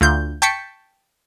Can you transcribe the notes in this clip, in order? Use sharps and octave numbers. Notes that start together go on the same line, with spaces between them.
D2 F4 G6
G5 A5 C#6 B6 C#7